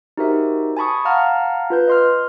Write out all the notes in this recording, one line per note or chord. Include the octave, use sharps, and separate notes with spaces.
D#4 F#4 G4 A#4 C5 E5
G#5 A5 B5 C#6 D#6
F5 F#5 A5 A#5 F6
F4 B4 G6
D#5 C6 F6